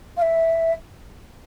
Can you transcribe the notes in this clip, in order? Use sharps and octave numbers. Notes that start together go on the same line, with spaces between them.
F5
E5